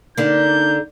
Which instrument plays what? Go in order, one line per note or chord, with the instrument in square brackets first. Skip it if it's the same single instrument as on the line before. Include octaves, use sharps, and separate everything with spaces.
[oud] D3 A#3 [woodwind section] D4 D#4 [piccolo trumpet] G6